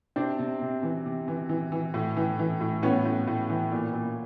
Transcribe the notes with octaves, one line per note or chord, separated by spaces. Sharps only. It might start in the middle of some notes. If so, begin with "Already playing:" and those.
C3 C4 D4
C3
C3
E3
C3
E3
E3
E3
A2
E3
E3
A2
A2 B3 C#4
A2
A2
E3
A#2
A#2